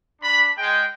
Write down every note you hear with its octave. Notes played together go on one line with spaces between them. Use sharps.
D4 B5
G#3 G5